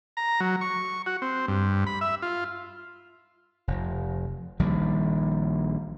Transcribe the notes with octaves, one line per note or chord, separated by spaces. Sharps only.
A#5
F#3
C#6
F#4
C4
G2
B5
E5
F4
F1
A#1 D#3 G3